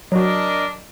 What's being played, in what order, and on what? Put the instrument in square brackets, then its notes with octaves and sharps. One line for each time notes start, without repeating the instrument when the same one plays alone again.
[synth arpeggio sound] F#3 F#4 [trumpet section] D4 A#4 D#5